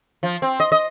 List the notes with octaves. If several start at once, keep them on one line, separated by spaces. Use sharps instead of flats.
F3
C4
D#5
D#5